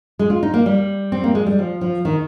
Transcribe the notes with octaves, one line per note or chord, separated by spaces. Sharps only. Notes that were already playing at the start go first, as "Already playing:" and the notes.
G#3
F4
D#4
A#3
G3
C4
A#3
G#3
G3
F3
F3
D#3